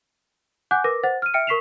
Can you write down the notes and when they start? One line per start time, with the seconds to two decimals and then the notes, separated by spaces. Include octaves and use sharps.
0.71 F#5 G#5 D6 F#6 G6
0.84 A#4 B4 D6 A#6
1.03 C5 F#5 A6
1.22 F6 D#7
1.34 E5 G5 F6 C#7 D7
1.47 A#4 C#6 B6 C7 E7 F7